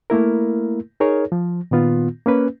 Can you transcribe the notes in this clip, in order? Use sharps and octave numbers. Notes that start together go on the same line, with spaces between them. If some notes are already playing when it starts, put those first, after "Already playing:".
A3 A#3 E4 A#4
D#4 G#4 A#4 C#5
F3
A#2 D#3 B3 F4
A#3 C#4 B4